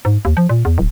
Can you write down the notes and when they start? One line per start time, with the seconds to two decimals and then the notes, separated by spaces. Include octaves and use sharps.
0.05 G#2
0.25 D#2
0.37 F3
0.49 A#2
0.65 E2
0.78 D1